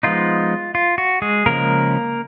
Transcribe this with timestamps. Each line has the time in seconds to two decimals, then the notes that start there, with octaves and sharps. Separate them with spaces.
0.03 F3 G#3 B3 D#4 F4
0.75 F4
0.98 F#4
1.22 G#3 G#4
1.46 C#3 F3 G#3 A#3 A#4